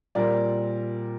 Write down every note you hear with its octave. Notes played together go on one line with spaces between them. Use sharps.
A#2 G3 C4 A#4 D5